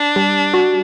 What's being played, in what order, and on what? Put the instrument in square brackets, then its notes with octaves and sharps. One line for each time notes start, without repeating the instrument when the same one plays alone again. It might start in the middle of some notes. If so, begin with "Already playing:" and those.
Already playing: [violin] D4
[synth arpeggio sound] G3
F#4